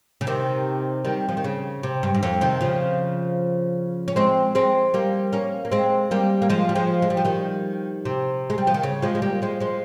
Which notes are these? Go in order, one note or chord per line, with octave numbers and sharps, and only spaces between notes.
C#3
C3 D#3
D#3 G3
F3
D#3
C#3
C3
G2
G2
F2
C3 D#3
C#3 F3
C#4
G#3 C4
G#3 C4
G3 A#3
A#3 C#4
A#3
G#3 C4
G3 A#3
A#3
F3 G#3
G3
F3 G#3
G#3
G3
F3
D#3 G3
C3
G#3
G3
F3
D#3
C#3
F3 G#3
G#3
G3 A#3
F3 G#3
F3 G#3